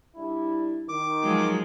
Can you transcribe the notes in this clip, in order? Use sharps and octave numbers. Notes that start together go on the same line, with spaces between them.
G3 D4 E4
D#3 D6
F3 F#3 G#3